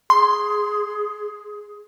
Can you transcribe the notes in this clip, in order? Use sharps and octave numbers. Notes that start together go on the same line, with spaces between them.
G#4 C6